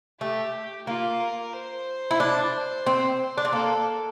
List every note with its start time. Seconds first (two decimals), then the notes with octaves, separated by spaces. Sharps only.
0.21 A3 G4
0.87 A#3 F4
1.20 A#4
1.53 C5
2.11 E4
2.20 D4
2.87 C4
3.38 D4
3.45 C4
3.53 A#3 A4